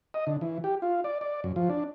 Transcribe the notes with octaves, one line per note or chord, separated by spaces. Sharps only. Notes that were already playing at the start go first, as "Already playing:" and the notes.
D#5
D3
E3
G4
F4
D5
D5
F#2
F3
D4